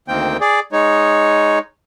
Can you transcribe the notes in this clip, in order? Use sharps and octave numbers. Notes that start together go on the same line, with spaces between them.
D2 D#3 A#3 C4 G5
G#4 D5
G#3 D#4 C#5